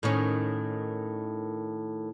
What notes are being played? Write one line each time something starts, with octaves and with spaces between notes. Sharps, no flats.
A2 D#3 C#4